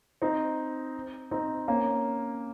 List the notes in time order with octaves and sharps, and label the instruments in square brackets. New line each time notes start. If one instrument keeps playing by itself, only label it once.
[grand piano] C4 D#4
C4 D#4
A#3 C#4